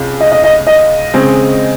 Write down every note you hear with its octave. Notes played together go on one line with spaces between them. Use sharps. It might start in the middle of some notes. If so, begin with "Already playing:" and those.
Already playing: C#2 C3
D#5
D#5
D#5
D#5
C#3 G#3 C4